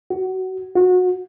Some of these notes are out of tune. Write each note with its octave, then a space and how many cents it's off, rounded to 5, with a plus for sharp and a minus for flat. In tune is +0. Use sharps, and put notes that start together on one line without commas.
F#4 +20
F#4 -25